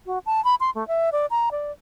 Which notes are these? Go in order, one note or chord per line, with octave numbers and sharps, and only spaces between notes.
F#4
A5
B5
C6
A3
E5
D5
A#5
D5